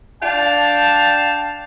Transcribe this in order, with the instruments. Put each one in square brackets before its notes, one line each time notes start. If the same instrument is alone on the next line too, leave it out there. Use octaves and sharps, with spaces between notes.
[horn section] D4 F5 G5 A5